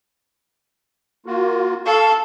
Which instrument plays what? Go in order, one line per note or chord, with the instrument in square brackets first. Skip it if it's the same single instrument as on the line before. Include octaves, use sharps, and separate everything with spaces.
[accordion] A#3 F4 F#4
[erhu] A4 [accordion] F5 C#6